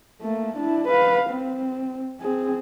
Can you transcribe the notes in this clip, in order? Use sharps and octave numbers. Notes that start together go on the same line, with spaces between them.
A3 A#3
D4 E4
B4 F5
C4
C4 G#4